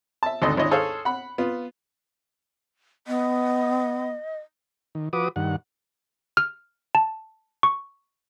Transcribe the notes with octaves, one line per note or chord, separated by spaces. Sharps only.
E5 A5
G#1 D2 A4 D#5
G#1 D4 E4 C#5 D#5
G#4 A4 C5 C#5 F5 E6
F#5 B5
B3 F4
B3 D#5
D#3
F3 F#4 B4 D6 D#6
G2 D#3 F#5
F6
A5
C#6